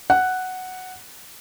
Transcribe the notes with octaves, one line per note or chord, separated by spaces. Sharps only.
F#5